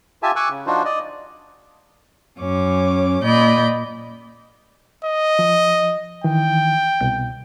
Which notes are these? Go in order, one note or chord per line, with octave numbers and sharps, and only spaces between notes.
F4 G4 E5 G#5 A5
G#5 C#6 D6 E6 F#6
C#3
F3 D4 D#4 F4 F#4 C5
D5 D#5
F#2 C#4 C#5 D6
A#2 D5 D#5 B5 G6
D#5
F3
D#3 E3 G5
C2 B2 G6